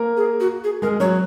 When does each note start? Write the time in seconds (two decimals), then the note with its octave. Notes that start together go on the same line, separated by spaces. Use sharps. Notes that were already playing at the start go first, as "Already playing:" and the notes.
Already playing: A#3 A#4
0.17 G#4
0.40 F#4
0.64 G#4
0.82 G#3 G#4 A#4
1.00 F#3 F#4 C#5